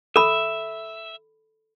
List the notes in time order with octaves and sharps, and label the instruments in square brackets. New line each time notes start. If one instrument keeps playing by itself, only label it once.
[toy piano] A4 B5 [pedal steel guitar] E5